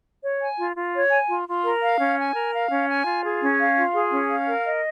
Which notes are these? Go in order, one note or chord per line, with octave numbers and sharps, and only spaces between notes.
C#5
G#5
F4
F4
C#5
G#5
F4
F4
A#4
F5
C#4
G#5
A#4
F5
C#4
G#5
F4
G#4
C#4
F5
F4
G#4
C#4
F5
A#4
D#5